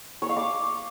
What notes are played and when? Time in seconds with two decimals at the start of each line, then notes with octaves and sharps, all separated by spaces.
0.22 C#5
0.29 F5
0.37 D6